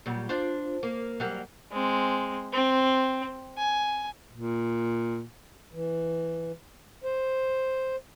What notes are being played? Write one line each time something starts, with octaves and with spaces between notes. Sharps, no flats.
A#2 F#3 G3
D4 F4 C5
A#3
F#3 G3 A#3
G#3 C4
C4
G#5
A#2
E3
C5